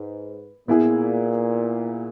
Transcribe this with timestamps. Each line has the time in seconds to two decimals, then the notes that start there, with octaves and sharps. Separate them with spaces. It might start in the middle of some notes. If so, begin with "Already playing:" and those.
Already playing: G#2 B4
0.67 A#2 B3 E4 G#4